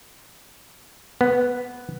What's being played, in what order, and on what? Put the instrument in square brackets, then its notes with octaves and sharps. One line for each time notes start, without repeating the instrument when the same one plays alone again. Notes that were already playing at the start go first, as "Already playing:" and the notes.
[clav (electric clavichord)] B3